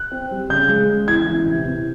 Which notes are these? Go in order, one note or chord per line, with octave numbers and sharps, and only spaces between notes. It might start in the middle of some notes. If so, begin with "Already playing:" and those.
Already playing: F#6
C4
G3
C#3 G6
G#3
C#3
E3 G#6
E3
C3
C3